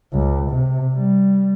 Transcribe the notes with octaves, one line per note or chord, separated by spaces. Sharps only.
C#2
C3
G3